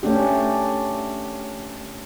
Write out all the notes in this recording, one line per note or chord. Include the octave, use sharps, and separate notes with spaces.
A3 C#4 D4 G4